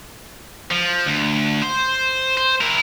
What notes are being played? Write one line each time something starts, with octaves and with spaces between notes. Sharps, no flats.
F3
D2
C5
C5
E4 A#4